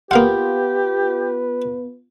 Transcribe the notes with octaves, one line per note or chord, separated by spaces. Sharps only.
A#3 B3 F4 G4 B4 F5 F#5